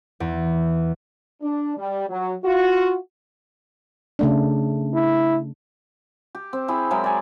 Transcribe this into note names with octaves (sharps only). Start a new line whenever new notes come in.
E2
D4
G3
F#3
F4 F#4
C#3 A3 D4
E4
G4
C4
C4 E4 G4 G#4
F#3 G#3 E4 A#4
D5 G#5